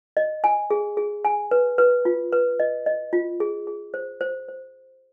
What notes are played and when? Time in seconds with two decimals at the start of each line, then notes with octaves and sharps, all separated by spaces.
0.17 D#5
0.44 G#5
0.71 G#4
0.97 G#4
1.25 G#5
1.51 B4
1.78 B4
2.05 F4
2.32 B4
2.60 D#5
2.86 D#5
3.13 F4
3.40 G#4
3.67 G#4
3.94 C5
4.21 C5
4.48 C5